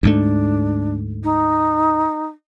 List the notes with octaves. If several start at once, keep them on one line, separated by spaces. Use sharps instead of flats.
D2 G#2 A3 D4
D#4